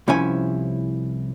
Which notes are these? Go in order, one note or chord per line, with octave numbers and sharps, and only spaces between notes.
C2 F3 C#4 E4 G#5